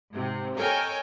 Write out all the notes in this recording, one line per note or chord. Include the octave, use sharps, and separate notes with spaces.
G#2 C3
A4 A#4 C#5 D#5 G5 G#5